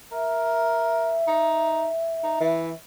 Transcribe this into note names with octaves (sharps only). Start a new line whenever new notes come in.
A#4 E5
D#4
D#4
E3